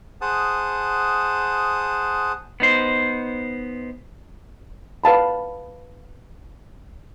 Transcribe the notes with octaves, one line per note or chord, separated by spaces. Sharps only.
G#4 C5 F#5 A5 D#6
B3 D#4 C5
B4 F5 A5 B5